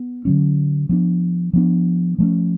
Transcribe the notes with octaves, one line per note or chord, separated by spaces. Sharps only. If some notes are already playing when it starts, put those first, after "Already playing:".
Already playing: B3
D3 F#3 C#4
F3 B3 D4
F3 B3 D4
F3 A3 C#4